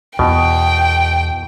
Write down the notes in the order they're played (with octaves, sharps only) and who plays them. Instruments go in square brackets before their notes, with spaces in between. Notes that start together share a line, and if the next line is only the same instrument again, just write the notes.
[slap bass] E2 [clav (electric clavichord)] B2 [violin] G5